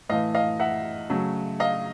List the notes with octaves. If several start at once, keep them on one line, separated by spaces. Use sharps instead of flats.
A2 E3 A3 D#5 F5
D#5 F5
E5 F#5
C#3 F#3 A3
D#5 F5